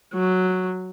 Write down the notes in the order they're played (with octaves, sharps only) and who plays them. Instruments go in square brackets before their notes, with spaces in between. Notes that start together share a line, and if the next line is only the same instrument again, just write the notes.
[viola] F#3